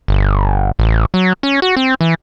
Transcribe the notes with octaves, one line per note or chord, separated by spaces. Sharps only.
G1
A1
F#3
C#4
F#4
C4
E3